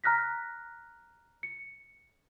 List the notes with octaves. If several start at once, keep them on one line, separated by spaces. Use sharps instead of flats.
A#5 F6 F#6 A#6 B6
C#7